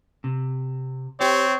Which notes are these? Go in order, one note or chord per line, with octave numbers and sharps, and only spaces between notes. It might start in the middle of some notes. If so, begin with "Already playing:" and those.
C3
C4 G4 C#5